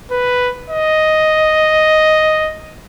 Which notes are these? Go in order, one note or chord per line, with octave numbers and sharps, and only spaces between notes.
B4
D#5